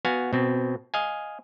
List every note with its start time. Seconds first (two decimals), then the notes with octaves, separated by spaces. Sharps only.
0.05 B3 F#4 F5 G#5
0.33 B2 C4
0.94 D#5 F5 G#5